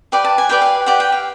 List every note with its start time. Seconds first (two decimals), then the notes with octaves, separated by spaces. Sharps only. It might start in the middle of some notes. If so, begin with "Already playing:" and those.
0.12 G4 B4 D5 G5
0.25 A5
0.38 G#5
0.49 G4 B4 D5 G5
0.62 F5
0.86 G4 B4 D5 F#5
1.00 G5
1.12 F5